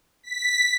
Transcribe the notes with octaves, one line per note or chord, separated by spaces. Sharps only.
B6